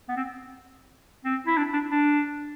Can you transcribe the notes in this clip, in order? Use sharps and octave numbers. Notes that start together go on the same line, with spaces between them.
B3
C4
C4
E4
D4
D4
D4